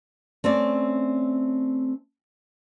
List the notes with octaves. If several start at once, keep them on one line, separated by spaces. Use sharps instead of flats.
A3 C4 C#4 D5